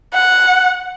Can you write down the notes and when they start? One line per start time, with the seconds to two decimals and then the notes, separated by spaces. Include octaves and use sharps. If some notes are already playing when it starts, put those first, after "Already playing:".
0.13 F#5